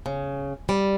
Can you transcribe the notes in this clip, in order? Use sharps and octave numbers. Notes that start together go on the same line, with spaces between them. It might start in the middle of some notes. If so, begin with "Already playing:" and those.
C#3
G3